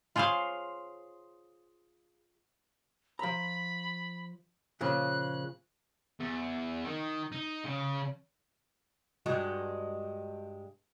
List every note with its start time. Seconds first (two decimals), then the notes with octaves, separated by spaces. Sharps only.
0.16 F4 G#4 C5 C#5 F5
3.19 F3 A#5 B5
4.81 A#2 C#3 F3 F#6
6.20 E2
6.84 D#3
7.32 D#4
7.65 C#3
9.26 G2 G#3 F#4